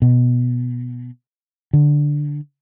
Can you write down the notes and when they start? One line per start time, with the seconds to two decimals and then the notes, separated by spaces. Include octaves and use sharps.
0.02 B2
1.73 D3